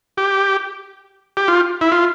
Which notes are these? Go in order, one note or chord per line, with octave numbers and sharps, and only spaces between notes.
G4
G4
F4
E4
F4